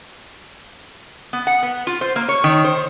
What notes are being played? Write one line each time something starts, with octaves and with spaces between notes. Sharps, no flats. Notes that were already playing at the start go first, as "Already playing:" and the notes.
B3
F#5
B3
F4
C5
A#3
C#5
D#3
C5